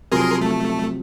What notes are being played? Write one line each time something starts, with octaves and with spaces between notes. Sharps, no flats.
C3 F3 F#3 G#4 A#4 C6
A3